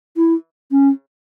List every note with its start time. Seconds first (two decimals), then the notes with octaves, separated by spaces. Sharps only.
0.17 E4
0.72 C#4